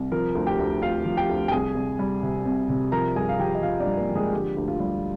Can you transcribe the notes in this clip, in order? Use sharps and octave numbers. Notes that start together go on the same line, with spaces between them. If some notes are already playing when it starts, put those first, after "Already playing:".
Already playing: C2
F3 A#4 A#5
D2
G4 G5
D2
D2 F4 F5
F3
G4 G5
D2
G5
C2 G#4 G#5
C2
G3
C3
C2
C3
F3 A#4 A#5
G2 G#4 G#5
F5
F3 G4 G5
D#5
F3 F4 F5
D4 D5
G2
A#3 A#4
F3
G#3 G#4
D3 G4
D2
F4
G3